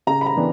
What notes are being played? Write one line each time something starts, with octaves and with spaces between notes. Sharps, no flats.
C#3 A#5
B5
A#5
E3 B3 D4